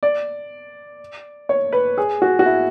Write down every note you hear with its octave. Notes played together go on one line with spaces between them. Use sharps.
D5
C#5
B4
G#4
F#4
F#4
E4